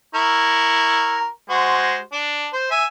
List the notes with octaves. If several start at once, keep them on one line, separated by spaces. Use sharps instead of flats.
E4 A#4 C#6
G#3 F#4 C5
D4
C5
E5 G#5